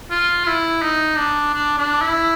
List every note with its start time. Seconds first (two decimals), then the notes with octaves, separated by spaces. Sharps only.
0.11 F4
0.46 E4
0.82 D#4
1.18 D4
1.54 D4
1.78 D4
2.02 E4